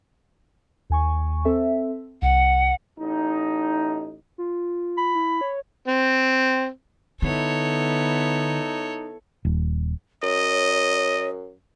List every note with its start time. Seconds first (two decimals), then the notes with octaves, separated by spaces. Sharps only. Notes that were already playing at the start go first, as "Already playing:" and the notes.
0.90 D#2 G#5 C#6
1.45 C4 A4 E5
2.22 C2 F#5
2.99 A1 D#4
4.38 F4
4.97 B5
5.15 E4
5.41 C#5
5.88 C4
7.22 D3 B3 D#4 E4 A4 C#5
9.45 D#1
10.23 F#2 C#5 D#5